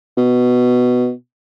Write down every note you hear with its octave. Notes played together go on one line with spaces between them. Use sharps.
B2